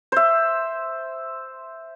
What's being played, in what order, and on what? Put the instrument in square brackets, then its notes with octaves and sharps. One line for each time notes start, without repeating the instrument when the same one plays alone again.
[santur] C5 E5